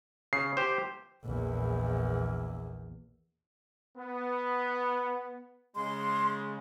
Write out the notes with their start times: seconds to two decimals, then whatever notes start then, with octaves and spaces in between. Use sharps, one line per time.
0.33 C#3 C7
0.57 G4 C5
1.24 A#1 E2
3.96 B3
5.76 C#3 G#3 C6